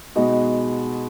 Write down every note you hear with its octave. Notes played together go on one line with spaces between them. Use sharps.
B2 G#3 B3 D#4 F#4